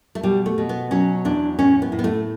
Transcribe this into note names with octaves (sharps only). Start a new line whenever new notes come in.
A3
B2 G3
A3
B2
B3
F#3 C#4
E2 D4
A2 C#4
B3
A2
B3
A3